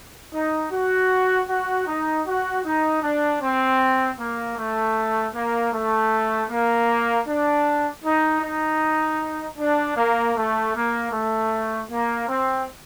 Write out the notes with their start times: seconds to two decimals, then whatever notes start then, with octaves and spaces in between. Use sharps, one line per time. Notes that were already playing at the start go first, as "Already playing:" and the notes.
0.30 D#4
0.69 F#4
1.46 F#4
1.84 D#4
2.24 F#4
2.63 D#4
3.01 D4
3.39 C4
4.17 A#3
4.55 A3
5.32 A#3
5.72 A3
6.48 A#3
7.25 D4
8.03 D#4
8.41 D#4
9.58 D4
9.95 A#3
10.34 A3
10.73 A#3
11.11 A3
11.89 A#3
12.27 C4